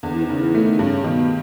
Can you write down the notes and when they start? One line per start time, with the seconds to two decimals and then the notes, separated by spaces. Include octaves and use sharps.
0.03 E2 D3
0.13 E3
0.23 D#3
0.29 C#3
0.41 E3
0.54 A3
0.61 D#3
0.78 G2 C#3
1.04 B2 D#3